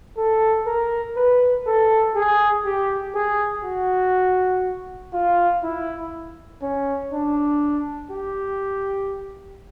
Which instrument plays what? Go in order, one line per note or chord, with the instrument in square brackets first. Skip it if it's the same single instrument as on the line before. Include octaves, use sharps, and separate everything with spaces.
[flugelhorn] A4
A#4
B4
A4
G#4
G4
G#4
F#4
F4
E4
C#4
D4
G4